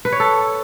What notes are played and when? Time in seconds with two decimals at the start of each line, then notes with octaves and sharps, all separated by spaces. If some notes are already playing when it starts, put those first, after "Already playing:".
0.05 B4
0.12 C#5
0.20 A4